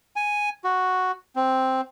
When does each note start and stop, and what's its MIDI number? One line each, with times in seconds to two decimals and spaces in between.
0.16 0.49 80
0.64 1.11 66
1.36 1.81 60